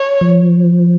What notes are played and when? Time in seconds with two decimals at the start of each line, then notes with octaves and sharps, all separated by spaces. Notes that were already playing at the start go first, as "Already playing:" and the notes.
Already playing: C#5
0.21 F3